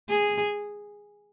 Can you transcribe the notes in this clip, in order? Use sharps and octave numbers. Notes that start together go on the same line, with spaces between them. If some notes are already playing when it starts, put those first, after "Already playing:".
G#4